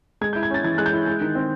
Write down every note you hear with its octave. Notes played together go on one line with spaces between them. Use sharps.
G#3 G#6
G6
E4
G#6
C#4 A6
E3 G#6
G#3 F#6
G6
E4
G#3
D#3
C4